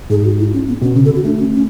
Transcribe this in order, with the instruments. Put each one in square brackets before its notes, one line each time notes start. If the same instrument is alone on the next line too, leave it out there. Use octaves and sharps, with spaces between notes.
[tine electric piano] G#2 [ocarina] G#4
[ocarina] F#4
E4
C#4
B3
[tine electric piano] B2 [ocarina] C#4
[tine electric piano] C#3 [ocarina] C#4
[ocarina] A4
[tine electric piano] D3 [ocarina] F#4
[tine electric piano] A3 [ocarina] D4
[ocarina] C#4
C#4